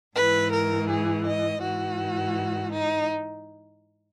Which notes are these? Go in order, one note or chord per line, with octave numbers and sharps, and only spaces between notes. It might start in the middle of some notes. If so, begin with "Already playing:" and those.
G#2 E3 B4
A#4
G#4
D#5
G#2 E3 F#4
D#4